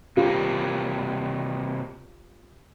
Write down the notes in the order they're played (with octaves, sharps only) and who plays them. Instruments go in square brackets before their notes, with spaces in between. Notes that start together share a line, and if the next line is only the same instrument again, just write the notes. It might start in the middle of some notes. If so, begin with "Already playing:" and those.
[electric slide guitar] C3 G3 A#3 [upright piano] F4 G4